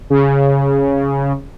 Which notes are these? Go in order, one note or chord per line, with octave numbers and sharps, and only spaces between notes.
C#3